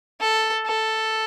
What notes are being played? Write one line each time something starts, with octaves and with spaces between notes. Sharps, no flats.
A4
A4